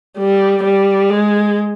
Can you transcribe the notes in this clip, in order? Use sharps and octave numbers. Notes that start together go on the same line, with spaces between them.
G3
G3
G#3